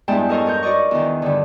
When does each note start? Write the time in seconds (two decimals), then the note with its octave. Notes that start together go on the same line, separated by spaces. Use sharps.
0.08 E2 G2 G#3 E4 G5 A5
0.29 A4 A#4 C#5 D#5 F5 A5
0.46 F4 A#4 C#5 G6
0.63 D#4 F#4 D5 D#5 C#6
0.91 E2 D#3
1.22 G2 D3